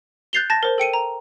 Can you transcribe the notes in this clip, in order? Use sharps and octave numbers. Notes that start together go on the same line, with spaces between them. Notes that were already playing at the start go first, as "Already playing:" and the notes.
F#6 G6 A6 C7 F7 G7
A5 A6 A#6
A#4 C5
A4 G5 C#7 D#7
A#5